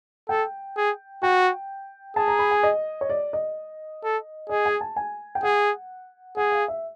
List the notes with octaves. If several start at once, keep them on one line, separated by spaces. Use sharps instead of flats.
A4 G5
G#4
F#4 G5
G#4 A5
A#5
B5
G#5
D#5
C#5
D5
D#5
A4
G#4 D#5
G#5
A5
G#5
G5
G#4 F#5
G#4 F#5
F5
E5